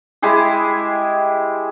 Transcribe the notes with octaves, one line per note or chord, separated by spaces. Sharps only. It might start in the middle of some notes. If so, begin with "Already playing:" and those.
G#3 E4 G4 G#4